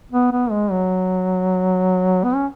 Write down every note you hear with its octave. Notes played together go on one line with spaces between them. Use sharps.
B3
B3
G#3
F#3
B3
C#4